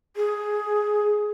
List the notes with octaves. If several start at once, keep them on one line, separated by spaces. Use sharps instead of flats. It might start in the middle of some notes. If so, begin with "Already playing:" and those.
G#4